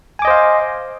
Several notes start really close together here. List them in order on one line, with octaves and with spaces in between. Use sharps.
G#5 D6 D#5 C5 F5